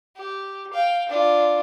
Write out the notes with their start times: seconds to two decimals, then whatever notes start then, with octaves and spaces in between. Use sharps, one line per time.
0.17 G4
0.73 F5 G5
1.09 D4 F4